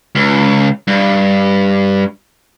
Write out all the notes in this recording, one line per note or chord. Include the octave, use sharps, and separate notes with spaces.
C#2
G2